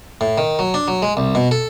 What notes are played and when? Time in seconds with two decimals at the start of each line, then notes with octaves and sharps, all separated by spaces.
0.21 A2
0.38 D#3
0.59 F#3
0.74 D4
0.88 F#3
1.02 G#3
1.17 C2
1.35 B2
1.51 A4